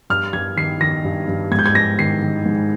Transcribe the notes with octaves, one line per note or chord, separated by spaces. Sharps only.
G2 F6
G2 G#6
D#3 C7
D#3 A#6
G2
G2
G#2 G#6
G6
G#6
G#2 A#6
D#3 C7
D#3
G#2